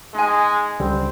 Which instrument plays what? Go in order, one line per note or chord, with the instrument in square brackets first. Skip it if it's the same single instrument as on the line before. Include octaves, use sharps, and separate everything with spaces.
[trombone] G#3 [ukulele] D#4 G#5
[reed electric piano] C#2 D3 G3 [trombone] C4